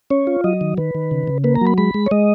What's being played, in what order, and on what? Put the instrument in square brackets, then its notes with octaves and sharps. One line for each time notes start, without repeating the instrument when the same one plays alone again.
[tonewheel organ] C#4 C#5
F4
F#3 D#5
D#3
D#3 B4
D#3
C#3
C#3
A#3 B4
A#5
F#3
B5
G#3 B5
G#3
C#5
G#3 D#5